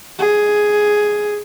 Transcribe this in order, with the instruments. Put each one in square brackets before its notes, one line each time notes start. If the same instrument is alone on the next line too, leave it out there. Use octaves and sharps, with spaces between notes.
[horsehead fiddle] G#4